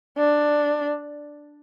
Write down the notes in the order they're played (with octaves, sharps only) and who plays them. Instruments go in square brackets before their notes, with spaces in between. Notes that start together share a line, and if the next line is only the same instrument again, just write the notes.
[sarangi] D4